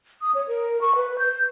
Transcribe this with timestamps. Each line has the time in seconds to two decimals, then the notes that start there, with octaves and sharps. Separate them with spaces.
0.21 D#6
0.35 C#5
0.48 A#4
0.81 C#6
0.96 B4
1.19 G6